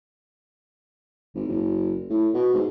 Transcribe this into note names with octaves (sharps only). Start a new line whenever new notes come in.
G#1
F#1
A2
B2
G#2